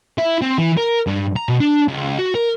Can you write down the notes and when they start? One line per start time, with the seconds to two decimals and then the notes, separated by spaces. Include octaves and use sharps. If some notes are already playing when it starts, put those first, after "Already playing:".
0.18 E4
0.42 C4
0.58 E3
0.77 A#4
1.07 G2
1.36 A#5
1.49 B2
1.61 D4
1.88 C#2
2.18 F#4
2.35 A#4